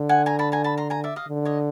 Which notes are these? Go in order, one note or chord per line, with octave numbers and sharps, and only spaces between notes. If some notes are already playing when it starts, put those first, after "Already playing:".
Already playing: D3
F#5 G#5
G#5 A#5
A5 B5
G#5 A#5
A5 B5
A#5 C6
G#5 A#5
D5 E5
D#5 F5
D3
C#5 D#5